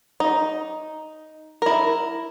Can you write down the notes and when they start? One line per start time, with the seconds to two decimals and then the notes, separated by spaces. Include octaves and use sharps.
0.20 D#4
1.62 E4 A#4